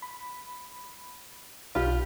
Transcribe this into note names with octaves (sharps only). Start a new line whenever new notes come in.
B5
B1 F4 G4 B5